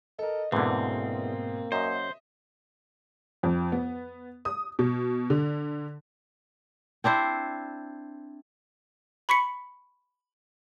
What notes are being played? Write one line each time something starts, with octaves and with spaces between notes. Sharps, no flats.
A4 A#4 D#5
E2 G#2 B2 D3 A#3 C4
F#2 C5 D#5 E5
F2
B3
D#6
B2
D3
C4 D4 E4 C5
B5 C#6 B6 C#7